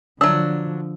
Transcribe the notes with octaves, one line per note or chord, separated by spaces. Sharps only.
D3 F3 F#3 D4 E6